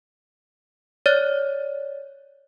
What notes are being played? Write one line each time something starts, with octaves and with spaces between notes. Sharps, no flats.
C#5 D5 F6 F#6 A6